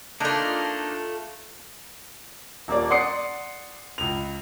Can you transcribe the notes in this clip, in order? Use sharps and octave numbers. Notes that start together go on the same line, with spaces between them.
A3 A#3 D4 D#4 F4
D#1 A#3 D5
D5 F#5 C6 D#6 C7 C#7
C#2 F7